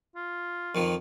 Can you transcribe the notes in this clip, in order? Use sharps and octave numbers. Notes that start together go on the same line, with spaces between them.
F4
F2 D#3 F3